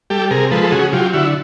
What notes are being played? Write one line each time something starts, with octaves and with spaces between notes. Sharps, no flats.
G3 G4 A4
C3 G#4 A#4
F3 G#3 A4 B4
A4
C#3 F#4 G#4
F#3 F4 G4
D3 E4 F#4